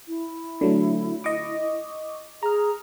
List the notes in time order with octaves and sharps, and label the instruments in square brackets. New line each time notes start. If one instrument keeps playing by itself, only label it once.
[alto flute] E4
[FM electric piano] D3 F#3 A3
D#5 C#6 D6
[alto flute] G#4 [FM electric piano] A#5 F6